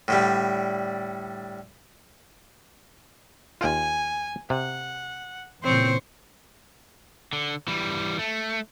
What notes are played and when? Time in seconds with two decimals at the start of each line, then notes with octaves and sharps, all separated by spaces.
0.08 A2 D3 G3
3.61 D#2 F4 G#5
4.50 C3 F#5
5.63 A#2 C#3 E3 C4 C5 C#5
7.33 D3
7.68 E3 G3
8.19 A3